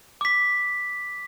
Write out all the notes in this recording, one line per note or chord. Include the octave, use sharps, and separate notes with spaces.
D6 B6